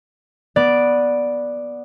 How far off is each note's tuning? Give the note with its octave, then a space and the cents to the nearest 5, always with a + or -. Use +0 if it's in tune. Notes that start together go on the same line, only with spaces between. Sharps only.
B3 -10 D5 +0